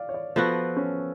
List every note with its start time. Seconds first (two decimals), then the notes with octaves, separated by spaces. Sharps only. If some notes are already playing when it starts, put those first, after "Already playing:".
Already playing: D5 F5
0.09 C#5
0.14 D5
0.36 F3 B3 F#4 A4
0.77 C#4